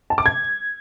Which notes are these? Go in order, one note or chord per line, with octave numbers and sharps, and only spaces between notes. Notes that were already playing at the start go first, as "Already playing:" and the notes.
A5
D6
G#6